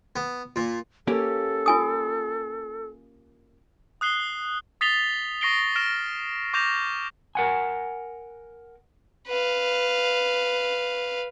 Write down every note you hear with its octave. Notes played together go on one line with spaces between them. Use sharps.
B3
A#2
A#3 C#4 G4 A4
F4 G#5 D#6
D#6 F#6 C7 G7
D#6 A6 B6 C7 F7 G7
C#6 A#6 C7 D7 G7
F6 A#6 D7 E7 G7
C#6 D6 G6 A#6 E7 F7
A#4 F#5 G#5
B4 F5